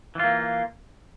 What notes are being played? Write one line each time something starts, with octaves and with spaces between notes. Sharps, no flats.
E3 A#3 F4